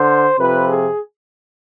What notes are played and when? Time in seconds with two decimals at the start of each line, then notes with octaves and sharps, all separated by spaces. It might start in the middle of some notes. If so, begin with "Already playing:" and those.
Already playing: D3 C5
0.37 F2 C3 F3 B4
0.68 G#4